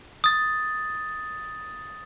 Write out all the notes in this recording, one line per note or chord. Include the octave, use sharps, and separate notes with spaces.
D#6 A6